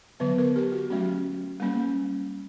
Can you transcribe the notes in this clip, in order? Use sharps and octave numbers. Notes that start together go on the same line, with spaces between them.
D3 F#3 B3 B4
A#4
G4
F#4
F#3 A3 C#4 F#4
G3 A#3 C#4